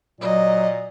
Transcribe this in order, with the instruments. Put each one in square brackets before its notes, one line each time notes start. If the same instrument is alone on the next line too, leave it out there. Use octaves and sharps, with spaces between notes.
[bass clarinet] A#2 [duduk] F#3 [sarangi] D#5